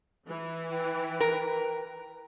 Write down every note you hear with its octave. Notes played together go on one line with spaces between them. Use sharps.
E3
B4 G5
A#4